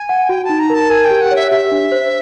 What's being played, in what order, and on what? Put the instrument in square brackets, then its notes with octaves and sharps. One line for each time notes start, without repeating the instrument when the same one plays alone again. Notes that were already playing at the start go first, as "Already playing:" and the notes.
Already playing: [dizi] G#5
[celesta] F#5
[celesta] F#4 [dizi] G5
[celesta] D#4 [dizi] A5
[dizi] A#5
[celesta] A#4 [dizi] A5
[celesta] A#4 [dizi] G#5
[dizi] G5
[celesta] G4
[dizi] F#5
[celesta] C#5 [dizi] E5
[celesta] G4 [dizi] E5
[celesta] D4
C5